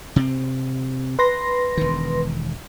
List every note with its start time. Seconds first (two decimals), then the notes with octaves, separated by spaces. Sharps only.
0.16 C3 C4
1.19 B4 C6 A#6
1.77 E1 D#3